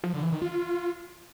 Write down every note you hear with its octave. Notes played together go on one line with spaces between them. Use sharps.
F3
D3
E3
D#3
F4